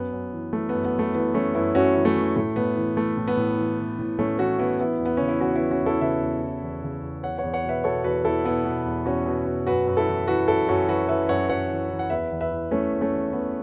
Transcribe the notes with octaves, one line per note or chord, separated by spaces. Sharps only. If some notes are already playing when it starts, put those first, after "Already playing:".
Already playing: F#2 B3
F#2
E3
E3 A3
F#2 B3
B3
F#2
A3
E3 B3
E3 A3 C#4
F#2 B3 E4
F#2 C#4 F#4
E3
A3 C#4
E3
A2 A3
A2 B3
E3
E3 A3
A2
B3
A2
E3
E3
A2
A2 A3 C#4
E3 C#4 F#4
E3 B3 E4
E3 B3 E4
E2
B3
C#3 C#4
E4
E2 C#4 F#4
E3 B3 E4
C#4 F#4
E2
E4 A4
C#3 B4 E5
E2
E3
E2
C#3
E2
E2 C#5 F#5
E2 C#5 F#5
C#5 F#5
B2
B4 E5
B2 A4 C#5
E2 F#4 B4
E2 E4 A4
B2 B3 E4
B2
E2
E2 C#4 F#4
B2
B2
F#2 F#4 B4
F#2
E4 A4
E3
E3 F#4 B4
F#2 E4 A4
F#2 C#4 F#4
E3 F#4 B4
E3 B4 E5
F#2 C#5 F#5
F#2 C#5 F#5
E3
E3
F#5
E2 B4 E5
E2
B4 E5
E3
E3 A3 C#4
E2
A3 C#4
E2
E3 B3